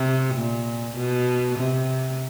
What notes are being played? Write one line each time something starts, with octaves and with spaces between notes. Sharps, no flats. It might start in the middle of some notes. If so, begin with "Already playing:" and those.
Already playing: C3
A#2
B2
C3